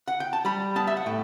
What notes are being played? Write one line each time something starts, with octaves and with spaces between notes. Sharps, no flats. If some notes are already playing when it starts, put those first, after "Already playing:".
F#5
G5
A5
G3 B5
B3 A5
E5
F#5
A2 G5